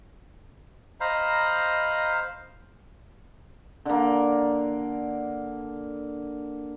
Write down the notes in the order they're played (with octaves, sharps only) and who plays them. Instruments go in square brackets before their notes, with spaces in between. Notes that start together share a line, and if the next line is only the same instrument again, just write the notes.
[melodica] C5 F5 [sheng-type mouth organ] D#5 A#5 B5
[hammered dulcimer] D3 A#3